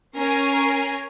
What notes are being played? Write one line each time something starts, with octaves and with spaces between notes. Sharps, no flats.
C#4 A#4 G#5 C7